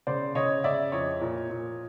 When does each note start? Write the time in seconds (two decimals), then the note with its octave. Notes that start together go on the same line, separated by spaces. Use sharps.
0.07 C#3 C5 D5
0.35 C#3 C#5 D#5
0.64 C#3 D5 E5
0.92 F2 C#5 D#5
1.21 A#2
1.50 A#2